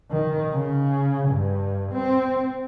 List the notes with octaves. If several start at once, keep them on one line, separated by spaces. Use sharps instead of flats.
D#3
C#3
G2
C4